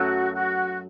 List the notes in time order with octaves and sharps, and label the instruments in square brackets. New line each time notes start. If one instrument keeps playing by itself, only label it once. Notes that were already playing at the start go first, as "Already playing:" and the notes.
Already playing: [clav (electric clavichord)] F#2 F#3 A3 [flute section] F#4
[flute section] F#4